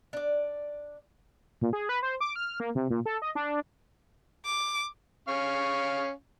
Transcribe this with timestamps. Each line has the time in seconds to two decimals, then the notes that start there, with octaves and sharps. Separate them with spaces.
0.13 D4 D5
1.61 A#2
1.73 G#4
1.89 B4
2.03 C5
2.21 D6
2.36 F6
2.60 A#3
2.75 C3
2.90 A#2
3.06 A4
3.22 D#5
3.35 D4
4.45 D6
5.28 C#4 F5 C#6